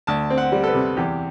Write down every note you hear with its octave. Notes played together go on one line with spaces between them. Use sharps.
D2 A5
C4
F#5
G3
A4
B4
C3
E2 G4